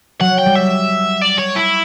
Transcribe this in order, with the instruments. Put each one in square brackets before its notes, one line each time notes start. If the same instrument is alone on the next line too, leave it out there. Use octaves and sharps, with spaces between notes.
[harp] F#3 [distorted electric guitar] F#5
[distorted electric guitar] G5
[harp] G3
[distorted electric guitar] E5
D5
C#5
E4